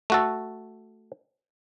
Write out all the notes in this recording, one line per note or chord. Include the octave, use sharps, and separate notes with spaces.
A3 F#4 A4